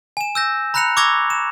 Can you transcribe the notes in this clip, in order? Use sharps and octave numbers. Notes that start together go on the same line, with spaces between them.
G#5 E7
E6 G6 A#6
A#5 B5 F#6 A#6 C#7 F7
C#6 D6 E6 G#6 A#6 F7
E7